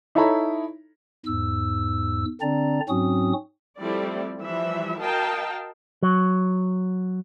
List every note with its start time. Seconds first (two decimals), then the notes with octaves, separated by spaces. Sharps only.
0.15 D#4 E4 A4 C#5 A#5 B5
1.26 E2 G#2 E6
2.41 D3 C4 D4 D5 A#5
2.89 G#2 F#3 C4 C#4 F#4 D#6
3.80 F3 G3 A3 C4 E4 D5
4.39 E3 F3 G3 E5
5.01 F#4 A#4 D#5 F5 G5 A5
6.03 F#3